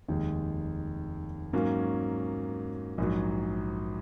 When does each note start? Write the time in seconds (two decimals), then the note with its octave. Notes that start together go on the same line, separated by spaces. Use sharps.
0.08 F1 D#2 D#3 G#3
1.53 G#2 F#3 A#3 C#4
2.98 A#1 G#2 F#3